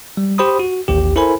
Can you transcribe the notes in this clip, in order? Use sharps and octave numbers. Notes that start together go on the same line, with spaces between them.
G3
G4 C5 B5 D#6
F#4
A1 D#2 G4
E4 A4 A#4 C5 G#5 B5